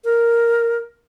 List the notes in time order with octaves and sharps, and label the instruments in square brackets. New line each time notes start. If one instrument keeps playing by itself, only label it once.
[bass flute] A#4